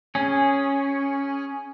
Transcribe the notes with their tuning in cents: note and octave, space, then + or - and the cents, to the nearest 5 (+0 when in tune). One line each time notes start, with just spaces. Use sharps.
C#4 +0 G#4 -5